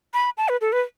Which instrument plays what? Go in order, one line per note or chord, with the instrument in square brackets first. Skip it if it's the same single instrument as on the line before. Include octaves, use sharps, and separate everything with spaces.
[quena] B5
A5
B4
A4
B4